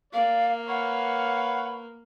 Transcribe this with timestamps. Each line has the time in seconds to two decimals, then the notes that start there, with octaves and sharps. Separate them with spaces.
0.13 A#3 D5 F5
0.68 B4 C#5 F5 F#5